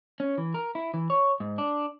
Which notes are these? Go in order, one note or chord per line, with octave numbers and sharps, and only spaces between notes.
C#4
E3
A#4
E4
E3
C#5
G#2
D4